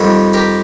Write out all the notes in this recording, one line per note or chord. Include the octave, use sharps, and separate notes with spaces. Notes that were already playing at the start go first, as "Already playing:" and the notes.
Already playing: F2 D#3 G3
G4 A#4